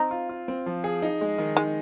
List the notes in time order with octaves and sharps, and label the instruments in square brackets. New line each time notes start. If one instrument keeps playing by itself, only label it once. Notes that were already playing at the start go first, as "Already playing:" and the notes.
Already playing: [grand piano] C4 [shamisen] D#4
[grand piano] F4
F4
C4
F3
G#4
D#4
G#3
D#3
[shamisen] G#3 [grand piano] D#4